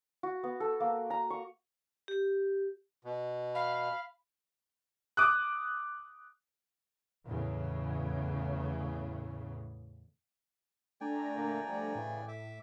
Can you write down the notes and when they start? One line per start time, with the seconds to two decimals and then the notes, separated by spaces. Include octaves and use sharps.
0.23 F#4
0.43 B3
0.60 A4
0.80 A#3
1.10 A#5
1.30 C#6
2.08 G4
3.05 B2
3.55 F5 B5
5.17 D6 D#6 F#6
7.26 E2 A2 C#3
11.01 A3 D4 D5 G5 G#5 A#5
11.35 A#2 D3 A#3
11.66 F3 G3
11.95 A2 C#3 E3
12.28 E5 D6